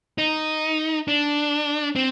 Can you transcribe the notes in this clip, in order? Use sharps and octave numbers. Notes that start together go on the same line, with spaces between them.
D#4
D4
C4